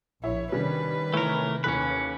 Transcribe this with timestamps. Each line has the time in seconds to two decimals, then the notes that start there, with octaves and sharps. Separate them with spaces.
0.24 A#1 E4 C#5
0.52 C3 D#3 G3 C#4 D4 B4
1.14 E3 A3 A#4 C#5
1.64 D#2 E3 C#4 A4 B4